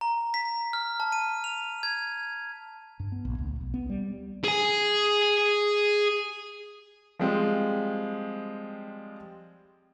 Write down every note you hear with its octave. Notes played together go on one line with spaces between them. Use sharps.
A#5
B6
F6
A5
D#7
F7
G#6
G2
B3
A#1
D2
B1
B3
G3
G#4 G#5
F3 G3 G#3 C4